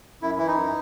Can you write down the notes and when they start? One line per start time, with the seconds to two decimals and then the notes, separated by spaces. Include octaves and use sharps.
0.22 F#2 E4
0.38 E3 E4
0.47 D#4
0.56 F#2